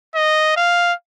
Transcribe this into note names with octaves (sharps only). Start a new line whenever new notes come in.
D#5
F5